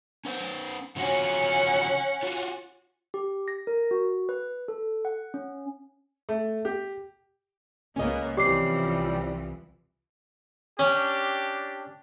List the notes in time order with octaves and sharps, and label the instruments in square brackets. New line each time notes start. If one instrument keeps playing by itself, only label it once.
[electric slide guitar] C#4 B4 C5
[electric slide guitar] C#3 F3 F#4 [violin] C#4 F#5
[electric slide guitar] F4 F#4
[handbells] G4
A#6
A#4
F#4
B4
A4
F#5
C#4
[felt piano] A3
G4
[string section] C#2 A#3 B3 [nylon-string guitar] C#4 D#5
[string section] C2 E3 F3 [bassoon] G3 [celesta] G4 D6 C7
[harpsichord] C#4 [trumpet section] D4 G4